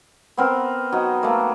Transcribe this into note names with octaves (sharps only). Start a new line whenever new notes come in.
B3 C4 A#4
F#3 D#4
A3 A#3